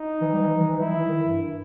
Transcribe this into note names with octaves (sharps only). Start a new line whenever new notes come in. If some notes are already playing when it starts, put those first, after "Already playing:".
Already playing: D#4
E3
G3
E3
E3
E3
G3 E4
E3
D#3
G2